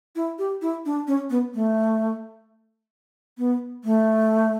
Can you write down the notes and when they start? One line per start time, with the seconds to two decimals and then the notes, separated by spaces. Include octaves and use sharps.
0.16 E4
0.39 G4
0.62 E4
0.86 D4
1.07 C#4
1.30 B3
1.55 A3
3.38 B3
3.84 A3